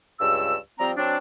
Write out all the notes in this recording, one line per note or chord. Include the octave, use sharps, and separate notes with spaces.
C#2 G2 E6
F3 G3 C4 A#5
F#3 C4 D4